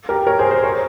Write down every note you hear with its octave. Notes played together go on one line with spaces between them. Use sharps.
G4 A#4
A#4 C#5
G#4 C5
G#4 C5
A#4 C#5